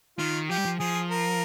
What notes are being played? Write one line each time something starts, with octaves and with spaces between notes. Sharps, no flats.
D#3 F4
F3 G4
G3
F3
F3 G#4
A#4